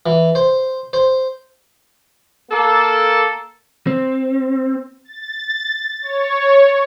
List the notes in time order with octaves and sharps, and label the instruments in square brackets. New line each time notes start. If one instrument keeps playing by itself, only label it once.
[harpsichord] E3
C5
C5
[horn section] A#3 A4
[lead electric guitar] C4
[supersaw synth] A6
C#5